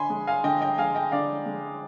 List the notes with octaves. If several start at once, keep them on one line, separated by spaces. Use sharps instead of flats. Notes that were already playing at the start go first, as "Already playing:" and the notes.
Already playing: D3 G#5 B5 C6
G#3
F5 G#5
D3 D#5 G5
D#5 G5
G#3 F5 G#5
D#5 G5
D3 D5 F5
G#3